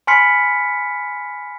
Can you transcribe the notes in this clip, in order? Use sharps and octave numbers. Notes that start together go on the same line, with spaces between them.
G#5 B5 C6 F6 B6 C#7